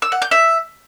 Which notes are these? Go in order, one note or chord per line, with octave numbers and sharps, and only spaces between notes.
E6
F#5
G6
E5